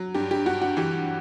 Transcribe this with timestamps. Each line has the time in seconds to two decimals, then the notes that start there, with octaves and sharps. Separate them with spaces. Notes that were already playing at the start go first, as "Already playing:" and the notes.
Already playing: F#3
0.14 G2 G4
0.31 G4
0.46 G2 F#4
0.61 F#4
0.77 E3 G4